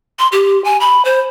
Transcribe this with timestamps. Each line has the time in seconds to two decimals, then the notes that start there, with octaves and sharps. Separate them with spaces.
0.19 C6
0.32 G4
0.64 G#5
0.80 B5
1.05 C5